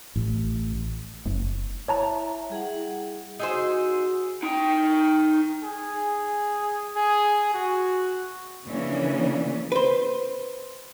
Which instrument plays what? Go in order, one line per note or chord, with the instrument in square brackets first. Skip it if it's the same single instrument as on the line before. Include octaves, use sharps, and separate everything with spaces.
[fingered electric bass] A1
[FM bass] F#1
[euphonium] E4 [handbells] C#5 A5 A#5
[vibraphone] G3 G#4 F#5
[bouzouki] D#4 G#4 C5 [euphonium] F#4 [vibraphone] E6
[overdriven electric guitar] D#4 G5
[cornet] G#4
G#4
F#4
[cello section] C#3 E3 F3 A#3 C#4 D4
[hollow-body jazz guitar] B4 C5